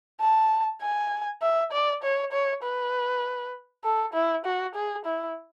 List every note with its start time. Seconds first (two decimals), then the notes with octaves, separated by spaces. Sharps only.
0.20 A5
0.82 G#5
1.42 E5
1.72 D5
2.03 C#5
2.32 C#5
2.63 B4
3.84 A4
4.14 E4
4.45 F#4
4.75 G#4
5.05 E4